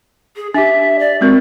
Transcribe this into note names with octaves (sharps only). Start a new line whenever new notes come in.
G#4
D4 G4 E5
D5
G#3 C4 F#4 A#4